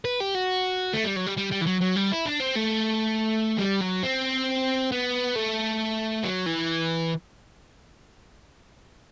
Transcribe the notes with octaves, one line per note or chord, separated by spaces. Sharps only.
B4
G4
F#4
A3
G3
F#3
G3
G3
G3
E3
F#3
F#3
G3
E4
D4
C4
A3
G3
F#3
C4
B3
A3
F#3
E3